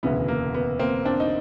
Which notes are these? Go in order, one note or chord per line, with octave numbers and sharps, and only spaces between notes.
E1 D2 C#3 E3 B3
A#3
B3
A#3 C4
C4 D4
D#4